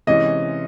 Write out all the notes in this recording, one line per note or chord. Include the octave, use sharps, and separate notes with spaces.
C3 E3 G#3 C#4 D#5